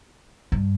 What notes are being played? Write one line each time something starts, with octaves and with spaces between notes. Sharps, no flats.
G2